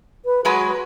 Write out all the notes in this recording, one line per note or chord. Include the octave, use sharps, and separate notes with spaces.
B4
F#3 G#3 F#4 B4